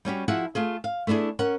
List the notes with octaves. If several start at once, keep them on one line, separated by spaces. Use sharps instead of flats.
G3 C#4 F#4 G4
F3 E4 F#4 G#4 F#5
A3 F4 G#4
F5
A3 B3 D4 E4 G#4
C#4 A#4 F#5